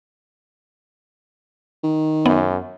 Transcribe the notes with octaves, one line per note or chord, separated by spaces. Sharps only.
D#3
F#2 B3